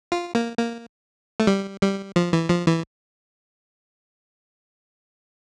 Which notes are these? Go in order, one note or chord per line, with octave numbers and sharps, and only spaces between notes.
F4
A#3
A#3
A3
G3
G3
F3
E3
F3
E3